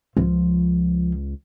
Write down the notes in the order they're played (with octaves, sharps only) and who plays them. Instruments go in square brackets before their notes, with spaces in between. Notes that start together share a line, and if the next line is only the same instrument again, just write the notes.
[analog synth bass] C#2 [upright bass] F3